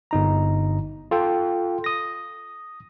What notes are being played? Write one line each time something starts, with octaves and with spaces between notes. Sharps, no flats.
G1 D#4 A#5
F4 A4 G5
D#6 A#6